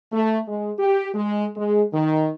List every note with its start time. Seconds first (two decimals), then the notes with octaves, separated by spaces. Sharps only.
0.12 A3
0.48 G#3
0.79 G4
1.14 G#3
1.57 G#3
1.94 D#3